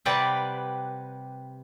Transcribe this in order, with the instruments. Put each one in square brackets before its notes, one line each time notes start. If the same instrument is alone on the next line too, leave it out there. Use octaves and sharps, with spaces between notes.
[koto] C3 G3 B4 D5 F#5 G5